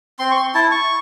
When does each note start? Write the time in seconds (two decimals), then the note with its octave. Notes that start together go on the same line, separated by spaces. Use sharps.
0.19 C4 C6
0.31 C#6
0.36 C6
0.55 E4 A5
0.72 C#6